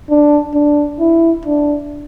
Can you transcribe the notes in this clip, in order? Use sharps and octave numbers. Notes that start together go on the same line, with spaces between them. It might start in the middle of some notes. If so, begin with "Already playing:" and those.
D4
D4
E4
D4